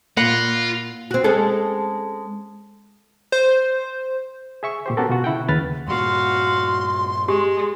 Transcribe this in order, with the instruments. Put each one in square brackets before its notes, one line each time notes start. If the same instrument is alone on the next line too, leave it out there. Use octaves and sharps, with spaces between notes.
[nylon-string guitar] A#2 A#3 [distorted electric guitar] F4 [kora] F#5 [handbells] B5 A#6
[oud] C4 F#4
G#3 C#4 A4
[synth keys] C5
[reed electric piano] G#4 E5 C#6
A#2 G4 C5
B3 C#4 F#4 G4 A4 A#4
B2 F4 F#4
C#3 E4 F#5 G5
D#2 C#3 B4 F6 A6
[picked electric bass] G2 A#2 [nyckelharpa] F#4 F5 [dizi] C6
[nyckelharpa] G#3 [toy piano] G4